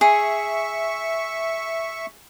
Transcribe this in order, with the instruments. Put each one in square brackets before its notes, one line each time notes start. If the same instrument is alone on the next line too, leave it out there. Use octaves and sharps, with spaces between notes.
[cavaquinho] G#4 [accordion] E5 C#6